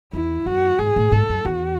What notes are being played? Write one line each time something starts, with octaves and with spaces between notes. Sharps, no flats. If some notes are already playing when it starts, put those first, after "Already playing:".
E2 E4
F#2 F#4
G#2 G#4
A2
G#2 A4
F#2
E2 F#4